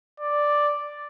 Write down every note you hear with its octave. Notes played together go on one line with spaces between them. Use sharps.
D5